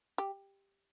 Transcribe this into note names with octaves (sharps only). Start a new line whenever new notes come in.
G4